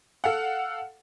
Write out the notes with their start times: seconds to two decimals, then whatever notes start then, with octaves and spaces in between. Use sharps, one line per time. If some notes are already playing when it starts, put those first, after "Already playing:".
0.24 A4 F5 F#5